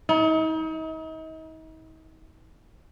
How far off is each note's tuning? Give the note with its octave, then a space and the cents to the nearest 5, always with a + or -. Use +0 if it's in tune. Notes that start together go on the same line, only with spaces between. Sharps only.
D#4 +40